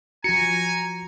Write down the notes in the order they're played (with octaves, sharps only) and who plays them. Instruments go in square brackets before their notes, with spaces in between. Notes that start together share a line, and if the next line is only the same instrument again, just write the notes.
[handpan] F3 F#4 [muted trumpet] G#5 [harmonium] A#5 [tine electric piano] C#7